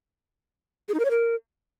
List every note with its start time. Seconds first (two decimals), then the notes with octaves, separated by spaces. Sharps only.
0.89 G#4
0.94 D#4
0.99 A#4
1.05 C#5
1.10 A#4